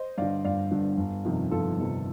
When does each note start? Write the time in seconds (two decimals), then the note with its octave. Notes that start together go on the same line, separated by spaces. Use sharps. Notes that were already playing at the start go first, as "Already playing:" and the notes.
Already playing: C5 D#5
0.18 G2 D3 D5 F5
0.44 G1 D5 F5
0.71 G2 D3
0.98 G1
1.25 F2 C3 D#3
1.51 G1 F4 A4
1.78 F2 C3 D#3